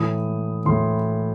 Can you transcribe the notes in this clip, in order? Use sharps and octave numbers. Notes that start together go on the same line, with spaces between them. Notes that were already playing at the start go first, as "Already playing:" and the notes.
Already playing: A2 E3 D#6
A2 E3 C6